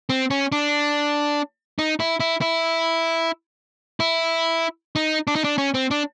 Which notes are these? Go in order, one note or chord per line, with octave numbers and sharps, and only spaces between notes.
C4
C#4
D4
D#4
E4
E4
E4
E4
D#4
D4
D#4
D4
C#4
C4
D4